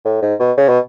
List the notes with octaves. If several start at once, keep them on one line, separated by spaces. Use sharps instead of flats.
A2
G#2
B2
C#3
B2